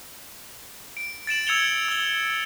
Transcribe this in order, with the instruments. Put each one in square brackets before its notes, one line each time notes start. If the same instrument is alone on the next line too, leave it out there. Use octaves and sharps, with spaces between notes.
[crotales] D7
A6 D7 E7 F#7
E6 G#6 C#7 F7 G7
E6 G7